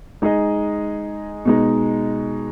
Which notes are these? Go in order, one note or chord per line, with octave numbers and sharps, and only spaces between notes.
G#3 D#4 G#4 D#5
B2 G#3 D#4